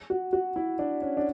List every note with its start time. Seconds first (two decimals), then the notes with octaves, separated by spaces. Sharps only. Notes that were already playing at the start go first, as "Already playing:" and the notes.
0.10 F#4
0.33 F#4
0.56 E4
0.79 D4
1.02 C#4
1.17 D4